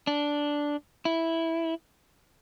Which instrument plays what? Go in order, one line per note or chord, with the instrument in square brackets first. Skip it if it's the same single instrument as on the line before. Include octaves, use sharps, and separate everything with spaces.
[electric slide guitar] D4
E4